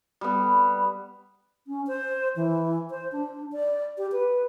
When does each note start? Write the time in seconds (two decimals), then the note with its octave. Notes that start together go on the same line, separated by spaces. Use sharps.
0.21 G3 B3
1.67 C#4
1.87 C5
2.36 E3
2.90 C5
3.12 D4
3.52 D5
3.98 G4
4.12 B4